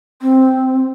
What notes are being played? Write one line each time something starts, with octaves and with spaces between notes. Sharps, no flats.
C4